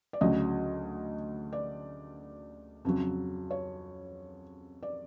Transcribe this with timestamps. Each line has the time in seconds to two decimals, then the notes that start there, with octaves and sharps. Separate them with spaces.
0.13 D5
0.21 D2 C#3 F#3 D#5
1.53 D5
2.85 F2 C#3 F#3
3.51 C#5
4.83 D5